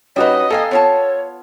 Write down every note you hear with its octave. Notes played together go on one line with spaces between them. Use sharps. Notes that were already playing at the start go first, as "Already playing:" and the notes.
G3 C#4 D#4 F#4 B4 D#5
A#3 A4 F5 G5 G#5
B3 F4 C#5 A5